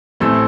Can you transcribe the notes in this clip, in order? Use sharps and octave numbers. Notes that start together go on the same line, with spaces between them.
A1 A2 A3 C4 E6